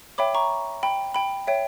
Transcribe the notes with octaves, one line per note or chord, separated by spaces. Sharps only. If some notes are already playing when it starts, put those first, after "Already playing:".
C#5 E5 G5 B5 D6
A#5 C#6
G5 B5
G5 B5
C#5 E5 G5